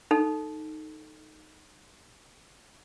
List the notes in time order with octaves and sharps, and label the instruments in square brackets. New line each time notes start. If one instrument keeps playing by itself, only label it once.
[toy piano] D#4 A4